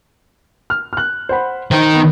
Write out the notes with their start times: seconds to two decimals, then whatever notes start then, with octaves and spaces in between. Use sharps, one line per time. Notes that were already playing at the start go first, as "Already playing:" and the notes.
0.70 F6
0.93 F6 F#6
1.29 C5 F#5 B5
1.71 D#3 D#4 C5
1.93 B3